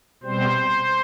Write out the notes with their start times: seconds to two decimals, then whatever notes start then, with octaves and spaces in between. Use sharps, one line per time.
0.24 B2 G3 C4 C5